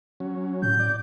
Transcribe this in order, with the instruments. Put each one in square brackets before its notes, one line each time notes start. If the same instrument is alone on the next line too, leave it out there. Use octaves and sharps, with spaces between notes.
[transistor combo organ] F#3 C#4
[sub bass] A2 [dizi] G6
[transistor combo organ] D5